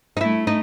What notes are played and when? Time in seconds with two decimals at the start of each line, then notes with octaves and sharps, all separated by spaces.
0.17 D#4
0.21 A3 E4
0.47 D#4